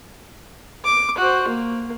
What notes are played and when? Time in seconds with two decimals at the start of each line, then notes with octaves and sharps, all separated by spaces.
0.84 D6
1.17 F#4 C5
1.48 A#3